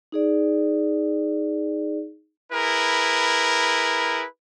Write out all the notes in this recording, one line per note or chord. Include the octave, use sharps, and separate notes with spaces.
D#4 G#4 D5
E4 G#4 A#4 B4